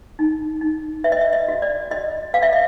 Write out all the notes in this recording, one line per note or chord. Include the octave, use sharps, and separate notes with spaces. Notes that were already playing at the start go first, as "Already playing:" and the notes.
D#4
D#4
B4 E5
D#5
E5
D#5
F#4
D5
F#4 D#5
B4 F5
E5
D#5